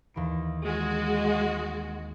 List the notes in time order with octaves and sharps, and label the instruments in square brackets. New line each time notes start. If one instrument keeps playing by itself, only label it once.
[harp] D#2 E3 D7
[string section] G#3 F#4